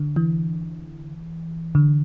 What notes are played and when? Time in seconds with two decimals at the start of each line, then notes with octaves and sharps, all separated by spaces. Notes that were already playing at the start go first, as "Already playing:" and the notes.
Already playing: D3
0.16 E3
1.75 D3